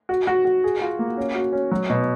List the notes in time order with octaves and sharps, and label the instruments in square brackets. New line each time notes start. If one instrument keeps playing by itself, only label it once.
[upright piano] F#4
F#4
F#4
G#4
F4
A#3
C#4
F#4
C#4
F#3
B2